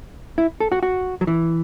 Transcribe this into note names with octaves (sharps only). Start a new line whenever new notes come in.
E4
A4
F#4
F#4
F#3
E3